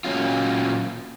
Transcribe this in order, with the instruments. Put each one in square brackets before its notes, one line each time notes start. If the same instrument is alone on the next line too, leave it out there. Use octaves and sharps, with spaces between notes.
[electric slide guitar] A#2 F#3 C#4 F4